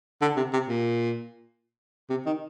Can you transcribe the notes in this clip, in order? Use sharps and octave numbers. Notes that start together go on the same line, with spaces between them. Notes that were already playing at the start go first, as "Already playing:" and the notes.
D3
C3
C3
A#2
C3
D#3